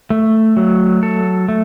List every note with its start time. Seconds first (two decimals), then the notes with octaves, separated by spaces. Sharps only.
0.10 A3
0.57 F#3
1.03 A4
1.49 A3